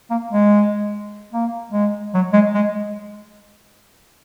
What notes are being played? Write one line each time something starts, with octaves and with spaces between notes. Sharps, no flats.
A#3
G#3
A#3
G#3
F#3
G#3
G#3